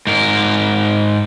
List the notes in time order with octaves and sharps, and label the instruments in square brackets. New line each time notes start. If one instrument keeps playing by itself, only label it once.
[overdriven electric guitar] G#2 A#4